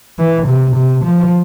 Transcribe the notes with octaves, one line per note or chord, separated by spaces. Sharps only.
E3
C3
C3
F3